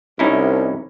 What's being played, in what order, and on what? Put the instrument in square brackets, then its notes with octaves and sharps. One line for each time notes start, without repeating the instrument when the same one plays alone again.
[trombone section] C2 [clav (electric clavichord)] C#4 D#4 E4